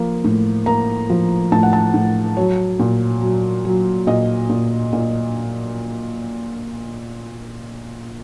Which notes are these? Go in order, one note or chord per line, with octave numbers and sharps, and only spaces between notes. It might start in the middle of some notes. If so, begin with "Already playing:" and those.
Already playing: F3 A#3
A2
A#3 A#5
F3
A2 A5
F#5
A5
A2
F#3 C#5
A#2
F#3
F#3
A#2 D#5
A#2
A#2